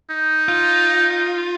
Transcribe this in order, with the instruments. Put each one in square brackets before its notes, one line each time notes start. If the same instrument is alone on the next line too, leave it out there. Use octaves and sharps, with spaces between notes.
[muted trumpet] D#4
[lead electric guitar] F4